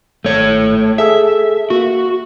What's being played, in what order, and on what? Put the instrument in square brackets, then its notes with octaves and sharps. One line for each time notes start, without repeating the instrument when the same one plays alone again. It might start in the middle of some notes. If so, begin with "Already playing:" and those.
[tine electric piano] G#1 [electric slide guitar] A3 C#5
[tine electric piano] G#4 A4 E6 [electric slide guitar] E5
[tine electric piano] A#3 [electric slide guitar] F#4